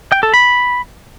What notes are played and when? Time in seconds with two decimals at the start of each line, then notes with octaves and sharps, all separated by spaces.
0.12 G5
0.23 A4
0.34 B5